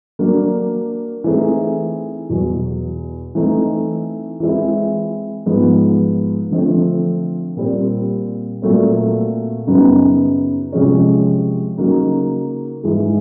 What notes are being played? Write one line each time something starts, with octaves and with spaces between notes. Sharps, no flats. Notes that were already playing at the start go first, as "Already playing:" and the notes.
F#3 A#3 D4
E3 A3 C4 D#4 G#4
E2 B2 F#3
E3 A3 C4 D#4
E3 G#3 C4 E4
G#2 F3 G#3 B3
D3 F3 A3 C4
A#2 G3 C4
A#2 F#3 A3 C4
F#2 C#3 F#3 B3 D#4
C3 F3 G#3 C#4
C#3 F#3 A#3 D#4
G#2 E3 G#3